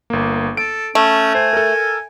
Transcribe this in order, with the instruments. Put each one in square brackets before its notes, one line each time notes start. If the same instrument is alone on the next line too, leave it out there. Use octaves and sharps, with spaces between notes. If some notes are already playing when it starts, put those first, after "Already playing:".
[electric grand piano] G1 A#3
[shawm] A4 [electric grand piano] D7
[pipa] A3 [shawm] C#4
[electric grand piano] C5 [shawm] G#5
[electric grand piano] A4 A#4